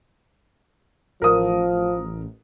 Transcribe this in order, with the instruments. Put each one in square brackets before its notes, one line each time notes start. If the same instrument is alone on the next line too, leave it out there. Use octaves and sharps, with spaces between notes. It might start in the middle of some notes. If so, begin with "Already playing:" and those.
[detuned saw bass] A1 [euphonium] F3 [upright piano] A#4 D#6